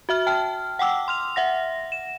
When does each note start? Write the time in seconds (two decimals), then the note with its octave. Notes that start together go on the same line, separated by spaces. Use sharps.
0.09 F#4 E5 F6
0.27 G5 A5 F6
0.79 F#5 G5 D6 E6
1.08 C6 F6 F7
1.36 E5 F#5 A#6
1.92 E7